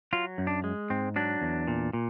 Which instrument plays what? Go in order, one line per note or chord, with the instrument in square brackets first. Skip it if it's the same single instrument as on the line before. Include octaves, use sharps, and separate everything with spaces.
[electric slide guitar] F#3 F4
F#2
D4
G#3
G#2 C4
F#3 D4
E2
A#2
A#2